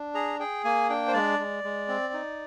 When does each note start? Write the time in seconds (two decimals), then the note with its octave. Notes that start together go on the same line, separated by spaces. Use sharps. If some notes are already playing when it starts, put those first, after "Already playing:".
Already playing: D4
0.14 G#4 A#5
0.40 G#4 G5
0.64 A#3 G#5
0.89 D4 G5
1.08 C5
1.14 G#3 D5
1.39 G#3
1.64 G#3
1.89 C4
2.13 D#4